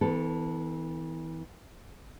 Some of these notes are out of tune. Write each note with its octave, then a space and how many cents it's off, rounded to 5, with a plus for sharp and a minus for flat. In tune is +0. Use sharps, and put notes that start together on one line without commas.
E3 -30 B3 +30 A4 +0